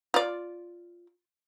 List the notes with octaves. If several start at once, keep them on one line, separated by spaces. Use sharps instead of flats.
F4 D5